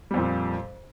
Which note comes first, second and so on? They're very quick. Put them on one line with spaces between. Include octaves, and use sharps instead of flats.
G3 F2 A#2